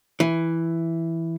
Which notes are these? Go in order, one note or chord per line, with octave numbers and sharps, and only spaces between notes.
E3